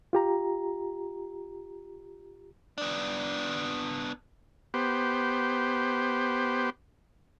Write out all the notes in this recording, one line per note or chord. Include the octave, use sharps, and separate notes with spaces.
F4 G4 A#5
B3 D4
B3 G4 C5